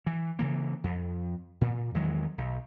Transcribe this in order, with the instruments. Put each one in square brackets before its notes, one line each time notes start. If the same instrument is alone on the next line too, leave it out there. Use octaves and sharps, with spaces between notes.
[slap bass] E3
C#3 E3 A#3
F2
A#2
E2 D#3 F#3 G#3
B1